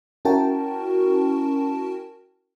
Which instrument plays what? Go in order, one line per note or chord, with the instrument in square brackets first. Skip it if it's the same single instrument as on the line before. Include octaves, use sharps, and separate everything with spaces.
[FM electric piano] C#4 E4 F#4 A#4 G5 A5